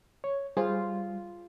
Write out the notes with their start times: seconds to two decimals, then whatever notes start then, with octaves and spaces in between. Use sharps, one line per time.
0.24 C#5
0.57 G3 F4 G#4 C5